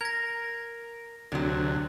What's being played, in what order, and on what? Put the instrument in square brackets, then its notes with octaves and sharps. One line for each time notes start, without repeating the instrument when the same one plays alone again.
[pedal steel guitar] A#4 [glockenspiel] G#6 A#6
[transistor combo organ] D2 [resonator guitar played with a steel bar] C3 F#3